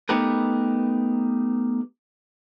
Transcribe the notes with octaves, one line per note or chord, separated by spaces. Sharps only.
A3 B3 D#4 G4 A#4 B4